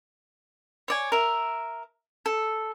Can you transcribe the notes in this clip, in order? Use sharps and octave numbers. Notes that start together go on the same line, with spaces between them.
C#5 D5 G#5
A#4 E5
A4